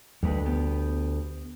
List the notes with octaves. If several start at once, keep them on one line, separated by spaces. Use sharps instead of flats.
D2 G3 G#3 B4
B3 G4